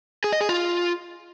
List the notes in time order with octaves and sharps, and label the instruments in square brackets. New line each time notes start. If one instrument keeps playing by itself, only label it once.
[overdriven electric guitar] G#4
D#5
G#4
F4